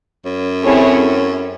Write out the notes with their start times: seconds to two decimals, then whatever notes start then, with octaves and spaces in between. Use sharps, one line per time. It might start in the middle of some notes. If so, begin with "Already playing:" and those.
0.25 F#2
0.63 A3 C4 E4 G#4 C#5